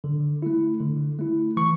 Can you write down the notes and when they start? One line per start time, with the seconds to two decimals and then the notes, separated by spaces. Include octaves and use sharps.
0.04 D3
0.42 A3 E4
0.80 D3
1.19 A3 E4
1.57 E3 C#6